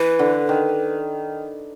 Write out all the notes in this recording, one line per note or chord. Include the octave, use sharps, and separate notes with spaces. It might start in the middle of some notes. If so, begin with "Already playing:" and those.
Already playing: E3 B4
D3
D#3